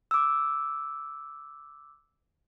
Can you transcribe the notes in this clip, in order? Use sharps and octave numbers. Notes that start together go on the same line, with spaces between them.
D6 E6